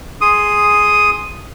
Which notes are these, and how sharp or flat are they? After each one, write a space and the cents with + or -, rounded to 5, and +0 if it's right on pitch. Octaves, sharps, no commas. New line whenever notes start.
G#4 +0 C6 +0 D#6 +0